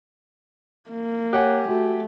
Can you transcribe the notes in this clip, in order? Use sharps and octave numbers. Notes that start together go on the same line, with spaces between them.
A#3
G4 C#5 F#5 G#5 F#6
A3 F#4